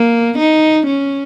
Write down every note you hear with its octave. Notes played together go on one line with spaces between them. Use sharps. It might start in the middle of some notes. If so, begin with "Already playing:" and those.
Already playing: A#3
D#4
C#4